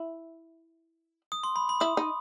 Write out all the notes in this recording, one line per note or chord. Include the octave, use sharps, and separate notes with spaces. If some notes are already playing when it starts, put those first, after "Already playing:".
Already playing: E4
D#6
C6
B5
B5
E4 D#6
D#4